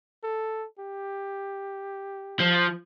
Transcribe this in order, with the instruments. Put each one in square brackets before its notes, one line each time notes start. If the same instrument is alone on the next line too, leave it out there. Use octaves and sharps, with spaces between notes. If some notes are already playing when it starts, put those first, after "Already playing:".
[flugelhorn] A4
G4
[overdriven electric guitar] F3